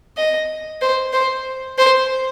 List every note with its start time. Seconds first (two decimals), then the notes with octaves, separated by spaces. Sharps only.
0.17 D#5
0.81 C5
1.13 C5
1.78 C5